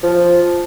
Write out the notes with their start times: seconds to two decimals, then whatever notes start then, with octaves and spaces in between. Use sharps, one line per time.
0.03 F3